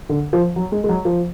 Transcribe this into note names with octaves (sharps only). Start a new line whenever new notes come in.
D3
F3
F#3
G#3
G#3
F#3
F3